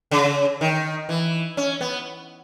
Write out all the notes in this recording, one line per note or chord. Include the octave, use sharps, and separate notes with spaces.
C#3
D#3
E3
C#4
B3